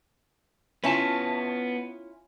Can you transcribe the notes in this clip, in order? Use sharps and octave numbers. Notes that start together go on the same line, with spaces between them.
B3 C#4 E4 F4 A5